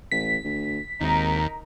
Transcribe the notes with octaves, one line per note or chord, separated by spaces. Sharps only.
A1 B6
D2
G#1 D#2 D#4 A#4